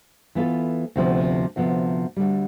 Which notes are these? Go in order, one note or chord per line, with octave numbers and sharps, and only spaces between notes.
E3 B3 F4 A4
D2 C3 F3 B3
D2 C3 F3 B3
D2 D3 G3